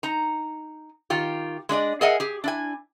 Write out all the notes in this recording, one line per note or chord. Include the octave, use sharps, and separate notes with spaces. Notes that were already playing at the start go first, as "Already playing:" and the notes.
D#4 A#5
D#3 F4 G4
G#3 D4 D5 D#5
G#4 A#4 D#5 E5 F#5 G#5
G4 G#4
D4 E4 G#5